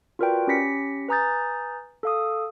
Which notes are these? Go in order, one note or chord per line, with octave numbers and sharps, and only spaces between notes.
F4 F#4 A#4 B4 D5 G5
C#4 G4 B5 A#6 B6 C#7
B4 G#5 A#5 D#6 G6 A6
A4 F5 D#6